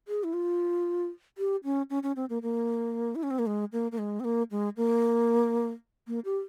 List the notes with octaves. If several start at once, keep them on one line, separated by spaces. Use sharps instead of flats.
G#4
E4
F4
G4
C#4
C#4
C#4
C4
A#3
A#3
E4
C#4
C4
A#3
G#3
A#3
A#3
G#3
C4
A#3
G#3
A#3
A#3
G4